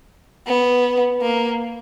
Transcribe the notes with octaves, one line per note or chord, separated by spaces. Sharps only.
B3
A#3